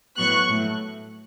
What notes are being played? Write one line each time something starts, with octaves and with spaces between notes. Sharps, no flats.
A2 F#3 B3 C#6 F#6
A2 F#3 A3